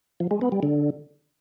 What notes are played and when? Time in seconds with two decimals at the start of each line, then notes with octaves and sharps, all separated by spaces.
0.20 F3
0.31 G#3
0.41 B3
0.52 G3
0.63 D3